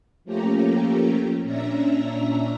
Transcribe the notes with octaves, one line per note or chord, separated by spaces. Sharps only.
F3 A3 A#3 C#4 G4 A#5
A#2 C#4 D4 E5 A#5 A#6